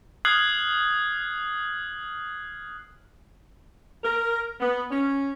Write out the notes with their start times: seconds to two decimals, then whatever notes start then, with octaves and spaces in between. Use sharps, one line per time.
0.25 D#6 F6 F#6 G#6 C7 F#7
4.04 A#4
4.60 B3
4.91 C#4